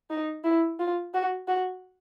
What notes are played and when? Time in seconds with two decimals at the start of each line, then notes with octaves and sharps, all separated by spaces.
0.10 D#4
0.44 E4
0.79 F4
1.14 F#4
1.48 F#4